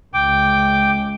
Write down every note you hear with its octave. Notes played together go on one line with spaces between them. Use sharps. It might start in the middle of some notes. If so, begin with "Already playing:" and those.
C#2 G5 D6